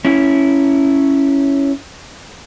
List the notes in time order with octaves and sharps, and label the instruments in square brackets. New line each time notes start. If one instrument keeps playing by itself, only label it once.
[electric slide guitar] C#4 E4